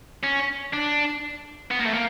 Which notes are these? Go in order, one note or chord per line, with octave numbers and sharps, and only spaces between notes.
C#4
D4
B3
A#3
A3
A#3